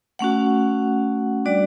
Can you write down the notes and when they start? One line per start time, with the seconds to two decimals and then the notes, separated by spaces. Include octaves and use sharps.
0.19 A3 C#4 F#4 F#5
1.45 G3 D4 F#4 D5